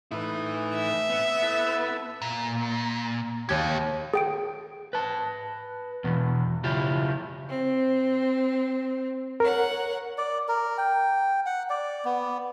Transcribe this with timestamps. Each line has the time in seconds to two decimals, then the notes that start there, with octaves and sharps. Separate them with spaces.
0.11 A2 D#4 E4 B4
0.75 E5
1.10 B3
1.42 E4 A4 B4
2.22 A#2
3.49 D#2 G4 F5 G#6
4.14 G#4 G5 D7
4.93 B4 A5
6.04 E2 B2
6.64 C#3 E4 F4 G4
7.50 C4
9.40 A#4 C#5 F#5
10.18 D5
10.48 A#4
10.78 G5
11.46 F#5
11.70 D5
12.05 B3